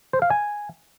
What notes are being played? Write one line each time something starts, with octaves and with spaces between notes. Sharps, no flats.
C5
F5
G#5